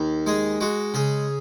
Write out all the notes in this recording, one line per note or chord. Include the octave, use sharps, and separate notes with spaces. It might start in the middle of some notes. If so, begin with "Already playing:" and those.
Already playing: D#2
G#3 G#4
G#3 F#4
C#3 G#4